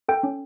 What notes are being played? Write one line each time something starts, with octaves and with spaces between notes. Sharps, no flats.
A4 G5
C#4